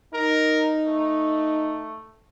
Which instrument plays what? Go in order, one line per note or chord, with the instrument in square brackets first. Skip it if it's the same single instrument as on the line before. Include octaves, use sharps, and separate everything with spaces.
[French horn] D#4 [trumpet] A#4
[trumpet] A3